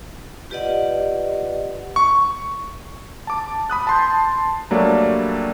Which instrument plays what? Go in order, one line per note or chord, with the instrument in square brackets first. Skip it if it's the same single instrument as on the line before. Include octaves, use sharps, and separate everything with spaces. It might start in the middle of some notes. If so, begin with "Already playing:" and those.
[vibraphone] F4 G4 B4 D5 D#5 F#5
[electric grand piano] C#6
A5 D6
B5 D#6 F#6
A5 C6 G6
F#3 G3 A3 A#3 D4